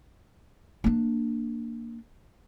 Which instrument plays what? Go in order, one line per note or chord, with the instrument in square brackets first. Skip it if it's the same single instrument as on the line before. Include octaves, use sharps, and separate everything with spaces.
[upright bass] A#3 D4